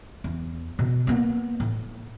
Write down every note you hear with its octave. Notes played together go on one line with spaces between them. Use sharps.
E2
B2
A#3 B3
A2